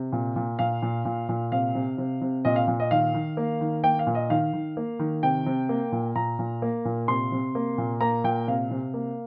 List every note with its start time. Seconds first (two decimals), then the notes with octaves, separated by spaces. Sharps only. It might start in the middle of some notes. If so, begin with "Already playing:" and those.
Already playing: C3
0.12 A#2
0.36 A#2
0.59 A#2 F5
0.82 A#2
1.05 A#2
1.29 A#2
1.52 C3 F5
1.75 C3
1.98 C3
2.21 C3
2.45 A#2 D#5
2.56 F5
2.68 A#2
2.80 D#5
2.91 D#3 F5
3.14 D#3
3.37 A#3
3.61 D#3
3.84 A#3 G5
3.99 F5
4.07 A#2
4.15 D#5
4.30 D#3 F5
4.53 D#3
4.77 A#3
4.99 D#3
5.23 C3 G5
5.46 C3
5.69 A#3
5.92 A#2
6.15 A#2 A#5
6.39 A#2
6.62 A#3
6.85 A#2
7.08 C3 C6
7.32 C3
7.55 A#3
7.78 A#2
8.01 A#3 A#5
8.24 A#2 G5
8.47 C3 F5
8.71 C3
8.94 A#3